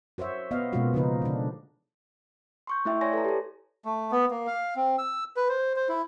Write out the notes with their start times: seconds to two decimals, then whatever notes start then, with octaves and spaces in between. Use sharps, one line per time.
0.18 F#4 C5 C#5 E5
0.51 B3 D#5 F5
0.73 B2 G#3 A#3 C#4 F4 F#4
0.94 C#3 F3 D#4 B4
1.22 D3 D4
2.67 C6 C#6 G6
2.85 A3 E4 E5 G5
3.01 C#5 D5 G#5 C6 A#6
3.13 A4 B4 A#5
3.25 G4 A4
3.85 A3
4.12 B3
4.31 A#3
4.47 F5
4.76 C4
4.98 E6
5.36 B4
5.49 C5
5.76 C5
5.89 E4